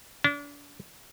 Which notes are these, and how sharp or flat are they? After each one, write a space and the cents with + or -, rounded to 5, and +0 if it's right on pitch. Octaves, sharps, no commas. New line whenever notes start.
D4 -35